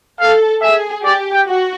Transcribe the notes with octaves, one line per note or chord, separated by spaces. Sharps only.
A4 F5
G#4 E5
G4 D5
G5
F#4